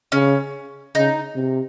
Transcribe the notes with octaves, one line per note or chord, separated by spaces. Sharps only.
C#3 C#4
C#3 D#4
C3